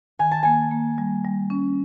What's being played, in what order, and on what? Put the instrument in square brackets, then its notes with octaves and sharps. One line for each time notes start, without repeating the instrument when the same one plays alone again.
[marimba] D#3 [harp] G#5
[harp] A5
[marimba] A#3 [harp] G#5
[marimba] A#3
G3
G3
C#4